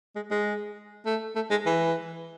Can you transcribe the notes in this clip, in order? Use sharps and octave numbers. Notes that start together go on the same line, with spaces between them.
G#3
G#3
A3
A3
G#3
E3